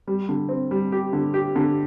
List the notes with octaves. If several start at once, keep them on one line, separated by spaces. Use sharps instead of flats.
G3
D3
C4
G3
G4
D3
G4
D3